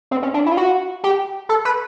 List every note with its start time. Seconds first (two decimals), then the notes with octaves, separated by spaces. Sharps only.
0.11 C4
0.23 C#4
0.34 D4
0.46 E4
0.52 F4
0.57 F#4
1.04 G4
1.49 A4
1.65 B4